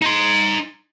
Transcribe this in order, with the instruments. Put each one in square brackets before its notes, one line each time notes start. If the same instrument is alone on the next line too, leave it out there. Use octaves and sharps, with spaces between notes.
[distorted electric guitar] D#4 C6